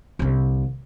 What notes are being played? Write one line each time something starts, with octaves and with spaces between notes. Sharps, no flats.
C2 D3